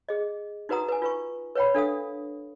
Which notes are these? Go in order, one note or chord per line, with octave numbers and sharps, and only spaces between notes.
G#4 D#5
D#4 F#4 B4 F#5 A#5 D#6
B4 G#5
F4 B4 C#6
B4 C#5 F#5 G5 B5
D4 A4 F5 D#6